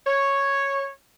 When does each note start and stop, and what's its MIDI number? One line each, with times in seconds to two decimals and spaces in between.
0.07 0.90 73